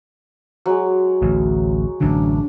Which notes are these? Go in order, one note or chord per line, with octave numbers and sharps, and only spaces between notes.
F#3 G#3
A1 D2
A1 F#2 D3 D4